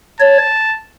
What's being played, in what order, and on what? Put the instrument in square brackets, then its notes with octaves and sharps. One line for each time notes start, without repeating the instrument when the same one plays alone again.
[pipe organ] C#5 [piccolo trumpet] A5